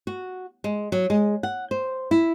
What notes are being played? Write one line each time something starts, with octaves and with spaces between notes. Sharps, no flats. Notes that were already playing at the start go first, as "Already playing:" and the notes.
F#4
G#3
F#3
G#3
F#5
C5
E4